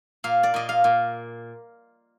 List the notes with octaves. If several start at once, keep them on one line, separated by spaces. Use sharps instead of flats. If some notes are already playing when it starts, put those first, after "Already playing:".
A#2 F5
D5
A#2 D#5
F5
A#2